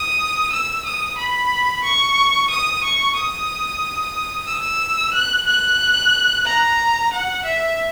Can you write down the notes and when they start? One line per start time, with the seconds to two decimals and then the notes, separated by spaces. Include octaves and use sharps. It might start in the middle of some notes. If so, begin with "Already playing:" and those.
Already playing: D#6
0.52 E6
0.85 D#6
1.18 B5
1.84 C#6
2.50 D#6
2.83 C#6
3.15 D#6
4.48 E6
5.14 F#6
5.47 F#6
6.45 A#5
7.12 F#5
7.44 E5